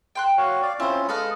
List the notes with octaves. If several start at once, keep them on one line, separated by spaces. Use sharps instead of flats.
G5 C6 F#6
F#4 C#5 F5
D5 F5
C4 C#4 E4 F4 C5
G#3 A4 B4 D#5 F5 D#6